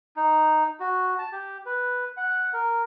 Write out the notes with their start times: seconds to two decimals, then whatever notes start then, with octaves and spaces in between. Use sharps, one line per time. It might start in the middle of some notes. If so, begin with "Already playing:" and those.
0.16 D#4
0.80 F#4
1.19 A5
1.32 G4
1.66 B4
2.17 F#5
2.53 A#4